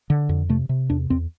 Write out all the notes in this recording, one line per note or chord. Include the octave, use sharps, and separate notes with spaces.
D3
F2
C3 A3
C3
E2 D4
E2 C4